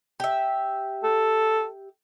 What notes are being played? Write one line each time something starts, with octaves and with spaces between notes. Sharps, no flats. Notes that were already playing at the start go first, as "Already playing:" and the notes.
G4 E5
A4